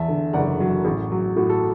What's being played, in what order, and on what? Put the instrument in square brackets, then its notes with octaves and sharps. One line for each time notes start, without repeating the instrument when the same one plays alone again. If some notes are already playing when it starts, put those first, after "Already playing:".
Already playing: [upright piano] E2 E5 A5
D3
F#1 D5 F#5
F#3
A1
F#3
A2 F#4
A4